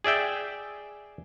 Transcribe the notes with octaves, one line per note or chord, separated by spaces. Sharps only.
G#4 D5 E5 G5